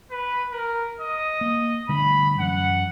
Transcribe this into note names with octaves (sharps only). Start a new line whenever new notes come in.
B4
A#4
D#5
A#3
D3 G3 A3 B5
F#2 E3 F#3 F#5